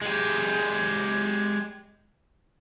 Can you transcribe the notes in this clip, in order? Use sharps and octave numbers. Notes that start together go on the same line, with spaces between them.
G#3 G4